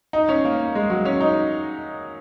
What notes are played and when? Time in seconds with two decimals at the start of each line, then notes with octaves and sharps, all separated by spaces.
0.13 D#4
0.29 C#4
0.45 A#3
0.75 G#3
0.90 F#3
1.05 C#4
1.21 D#4